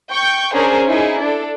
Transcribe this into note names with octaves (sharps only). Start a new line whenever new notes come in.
G5 C#6 G6
C#4 D4 G#4 A#4 C5
D#4 E4 G#4
D4 A4